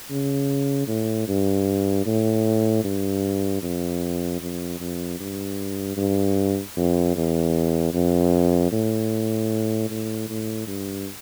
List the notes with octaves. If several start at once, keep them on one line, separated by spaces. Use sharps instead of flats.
C#3
A2
G2
A2
G2
F2
F2
F2
G2
G2
F2
E2
F2
A2
A2
A2
G2